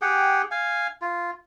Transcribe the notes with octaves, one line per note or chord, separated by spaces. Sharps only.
G4 G#4 F#5 G5
F5 G#5
F4